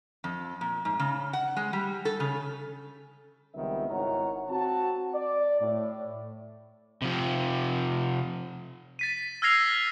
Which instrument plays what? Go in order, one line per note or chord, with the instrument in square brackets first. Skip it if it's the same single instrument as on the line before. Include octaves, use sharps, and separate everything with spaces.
[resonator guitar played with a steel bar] F2
A#2
G#2
C#3
F#5
G#3
G3
A4
C#3
[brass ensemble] C#2 D#3 G3 B3 C4 E5
G#1 D#3 E4 C#5 F#5 A#5
C4 F#4 A5
D5
A2
[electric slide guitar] C3 F3
[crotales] A6 B6 D#7
E6 F6 G#6 A#6 C7 F7